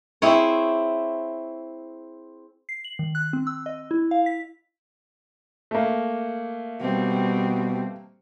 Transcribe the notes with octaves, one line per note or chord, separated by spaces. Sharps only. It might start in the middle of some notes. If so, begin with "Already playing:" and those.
C4 E4 G#4 C#5
C7
F#7
D#3
F#6
C4
E6
D#5
E4
F5
B6
A3 A#3
B2 G3 C4